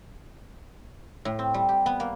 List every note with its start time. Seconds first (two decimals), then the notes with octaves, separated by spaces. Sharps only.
1.25 A2
1.39 C4
1.54 G3
1.69 G4
1.86 B3
2.00 A#3